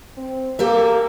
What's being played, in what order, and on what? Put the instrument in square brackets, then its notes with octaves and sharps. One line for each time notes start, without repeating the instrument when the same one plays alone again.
[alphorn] C4
[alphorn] A#3 [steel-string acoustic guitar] G4 A4 E5